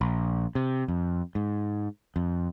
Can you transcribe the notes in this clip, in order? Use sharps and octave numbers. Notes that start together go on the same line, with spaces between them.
A#1
C3
F2
G#2
F2